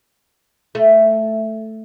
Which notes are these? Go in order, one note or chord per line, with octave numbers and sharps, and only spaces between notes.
A3